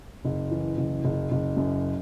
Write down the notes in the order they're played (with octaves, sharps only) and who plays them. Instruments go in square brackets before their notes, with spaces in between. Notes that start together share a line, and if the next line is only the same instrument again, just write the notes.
[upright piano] F#1
E3
F#1
F#1
F#1
F#2